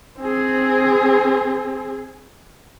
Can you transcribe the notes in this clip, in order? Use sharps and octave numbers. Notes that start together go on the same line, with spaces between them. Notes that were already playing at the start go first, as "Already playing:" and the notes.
C4 G#4